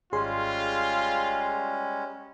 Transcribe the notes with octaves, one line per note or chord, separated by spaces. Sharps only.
G#1 G3 G#3 C#4 F4 G#4 C6